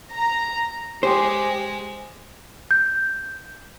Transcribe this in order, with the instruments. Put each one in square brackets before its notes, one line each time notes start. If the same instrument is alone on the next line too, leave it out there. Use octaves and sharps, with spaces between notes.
[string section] A#5
[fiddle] G#3 [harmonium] G4 [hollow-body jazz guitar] C5 [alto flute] G#5
[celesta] G6